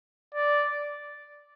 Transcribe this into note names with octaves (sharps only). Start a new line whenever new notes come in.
D5